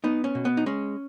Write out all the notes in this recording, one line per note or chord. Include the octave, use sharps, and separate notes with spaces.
B3 D#4
C#4
B2
B3
D#4
G#3 C#4